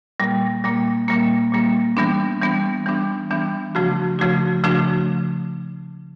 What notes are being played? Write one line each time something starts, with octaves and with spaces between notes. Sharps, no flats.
A#2 G3 A#3
A#2 G3 A#3
A#2 G3 A#3
A#2 G3 A#3
E3 G3 B3 D4
E3 G3 B3 D4
E3 G3 B3 D4
E3 G3 B3 D4
C#3 F3 A3 D4 F#4
C#3 F3 A3 D4 F#4
C#3 F3 A3 D4 F#4